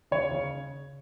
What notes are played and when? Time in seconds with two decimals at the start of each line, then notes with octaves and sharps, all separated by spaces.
0.11 C#3 C#5
0.31 C#3